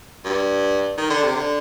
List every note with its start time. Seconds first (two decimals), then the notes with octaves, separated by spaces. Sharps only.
0.25 G2
0.98 D#3
1.10 D3
1.23 C3
1.35 D3